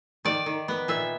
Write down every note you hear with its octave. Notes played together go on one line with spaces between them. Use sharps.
D#3 D5
D#3
B3
A#2 E5